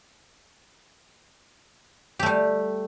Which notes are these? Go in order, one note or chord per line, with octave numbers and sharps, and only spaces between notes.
G3 A3 G4